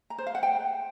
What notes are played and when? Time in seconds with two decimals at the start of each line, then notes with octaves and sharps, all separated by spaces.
0.10 A#5
0.18 C5
0.27 F5
0.35 F#5
0.43 G5